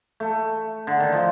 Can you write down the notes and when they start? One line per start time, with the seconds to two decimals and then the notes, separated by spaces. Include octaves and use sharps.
0.20 A3
0.87 D3
1.00 D#3
1.12 F3